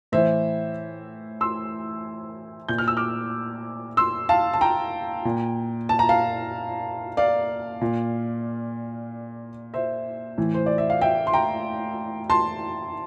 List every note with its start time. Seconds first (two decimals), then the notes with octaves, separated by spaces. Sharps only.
0.12 A2 E3 C5 E5
1.41 C6 E6
2.69 A#2 G6
2.78 F6
2.88 E6
2.97 D6 F6
3.97 C6 E6
4.29 F5 A5
4.54 A5
4.61 G5 A#5
5.25 A#2
5.89 A5
5.99 A#5
6.09 F5 A5
7.17 D5 F5
7.81 A#2
9.74 C5 E5
10.38 A2 E3
10.54 C5
10.66 D5
10.78 E5
10.90 F5
11.01 E5 G5
11.27 C6
11.33 G5 A#5
12.30 A5 C6